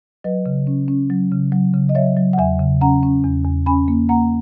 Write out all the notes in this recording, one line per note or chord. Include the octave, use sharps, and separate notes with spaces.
F#3 B4 D#5
C#3
C#4
C#4
F#3
C#3
F#3
C#3
D#5
F#3 C#5 E5
F#3
F#5
E2 E5 G#5
C#3
C#4 F#5 A#5
C#4
E2
E2
C#4 G#5 B5
A#3
A#3 F#5 A#5